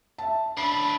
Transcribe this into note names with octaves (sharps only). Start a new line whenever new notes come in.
E5 A5
D4 E4 B5 C7